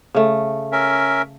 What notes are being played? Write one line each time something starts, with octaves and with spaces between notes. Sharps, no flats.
C#3 A3
C#4 A#4 E5